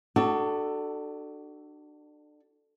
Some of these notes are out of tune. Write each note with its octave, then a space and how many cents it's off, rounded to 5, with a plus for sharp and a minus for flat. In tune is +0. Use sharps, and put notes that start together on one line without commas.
D4 +30 F#4 +30 A4 +0